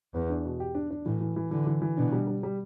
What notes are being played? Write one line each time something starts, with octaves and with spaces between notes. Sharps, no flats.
E2 B3
D4
B2
G4
D4
D4
A2 E3
E3
E3
D3 E3
E3
E3
B2 D4
G3
G3
G3